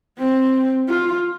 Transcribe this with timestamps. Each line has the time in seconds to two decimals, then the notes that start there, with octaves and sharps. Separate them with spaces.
0.18 C4
0.89 F4